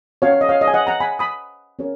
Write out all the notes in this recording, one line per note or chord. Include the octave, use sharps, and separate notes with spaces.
C#4 F#4 C#5 F5
C#5
D#5
C#5 F5
D#5
G#5
D#5 F#5
F#5 A#5
G#5 B5
B5 D#6
C#4 F#4 A#4 C#5